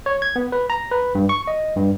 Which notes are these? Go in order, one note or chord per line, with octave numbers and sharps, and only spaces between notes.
C#5
G#6
B3
B4
A#5
B4
G2
C#6
D#5
G2